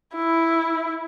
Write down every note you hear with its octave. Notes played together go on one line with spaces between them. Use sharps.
E4